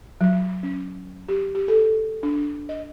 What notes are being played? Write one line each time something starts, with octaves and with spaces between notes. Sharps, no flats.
F#3
C#4
G4
G4
A4
D4
D#5